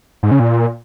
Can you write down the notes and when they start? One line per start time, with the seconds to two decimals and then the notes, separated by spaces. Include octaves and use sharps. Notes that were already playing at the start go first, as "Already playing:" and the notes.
0.23 G#2
0.31 C#3
0.40 A#2